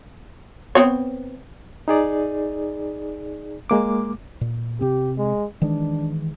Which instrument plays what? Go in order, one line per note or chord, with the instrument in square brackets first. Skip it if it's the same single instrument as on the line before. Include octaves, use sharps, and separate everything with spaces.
[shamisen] B3 C4 C#5
[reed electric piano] D#4 G#4 D5
G#3 A#3 D6
[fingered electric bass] A#2
[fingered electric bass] C3 C4 [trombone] G4
[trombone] G#3
[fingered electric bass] D#3 E3 G#3 [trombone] D4